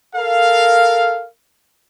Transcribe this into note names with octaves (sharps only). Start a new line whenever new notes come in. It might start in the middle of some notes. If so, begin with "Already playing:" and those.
A4 A#4 F5